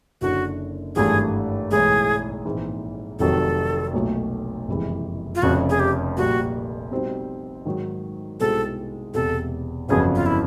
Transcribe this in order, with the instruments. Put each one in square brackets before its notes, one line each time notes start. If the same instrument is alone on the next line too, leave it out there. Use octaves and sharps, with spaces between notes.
[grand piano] F#1 F#2 D3 [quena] F#4
[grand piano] G#1 G2 E3 A3 [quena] G#4
[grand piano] B1 A2 E3 G#3 [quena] G#4
[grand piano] A#1 G#2 E3 G#3 C4
[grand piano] F1 F2 C3 D#3 F#3 [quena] A4
[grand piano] B1 A#2 F#3 A3
F#1 F2 C3 E3 G#3
[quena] F4
[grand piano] F1 F2 C#3 [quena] F#4
[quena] G#4
G4
[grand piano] A#1 A#2 G3 A#3 [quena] F#4
[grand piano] B2 G3 C4 D#4
G#2 D#3 F#3
[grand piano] C2 B2 G#3 C4 D#4 [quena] A4
[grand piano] E1 E2 C3 [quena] A4
[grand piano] G1 F2 C#3 F#3 B3 [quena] G#4
[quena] F4
E4